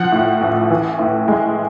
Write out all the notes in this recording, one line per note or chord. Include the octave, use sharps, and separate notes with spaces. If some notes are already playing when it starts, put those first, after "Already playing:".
Already playing: F3 F#5
A2
A1
E3
A2
G#3